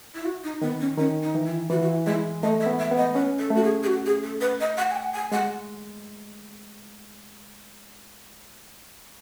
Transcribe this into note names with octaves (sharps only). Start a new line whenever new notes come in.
E4
F#4
D#4
D#3 B3
C#4
D#3 C#4
D#4
E3
E4
E3 F#4
F#4
E4
G#3 E4
A3 D#5
E5
B3
E5
B3
D#5
C#4 B4
A4
A3 F#4
G#4
G#4
F#4
G#4
A4
B4
D#5
F#5
G#5
F#5
G#5
G#3 F#5